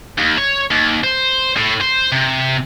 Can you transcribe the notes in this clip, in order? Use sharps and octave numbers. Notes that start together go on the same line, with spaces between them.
D#2
C#5
D#2
C5
A2
C5
C3